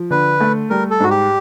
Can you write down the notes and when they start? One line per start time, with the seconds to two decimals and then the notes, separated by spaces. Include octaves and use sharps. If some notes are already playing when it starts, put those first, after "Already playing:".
Already playing: F3
0.11 D3 B4
0.41 A3
0.70 G3 A#4
0.91 A4
1.00 G#2 F#4
1.10 G4